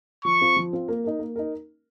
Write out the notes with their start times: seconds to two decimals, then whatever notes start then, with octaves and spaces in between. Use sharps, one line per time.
0.25 F3 C#6
0.41 C4 F4
0.56 F3
0.73 C4 F4
0.88 A#3
1.04 D#4 A#4
1.19 A#3
1.36 D#4 A#4